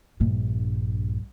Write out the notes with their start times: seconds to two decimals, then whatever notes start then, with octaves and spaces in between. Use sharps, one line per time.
0.20 A#1 G2